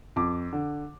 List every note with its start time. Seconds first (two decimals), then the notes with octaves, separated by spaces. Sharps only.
0.16 F2 D6
0.53 D3